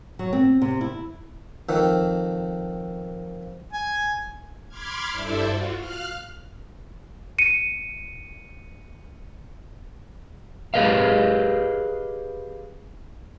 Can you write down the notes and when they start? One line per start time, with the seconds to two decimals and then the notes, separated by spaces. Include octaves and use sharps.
0.19 F#3
0.33 C4
0.62 C3
0.81 E4
1.69 F2 D#3
3.73 G#5
4.68 B5 C6 D6 F6 G#6
5.12 G2 E4 A4 C5 D5 E5
5.48 F4 F#4
5.78 F5 F6 F#6
7.39 C#7 D#7
10.74 G4 G#4 A#4 B4 D#5 F5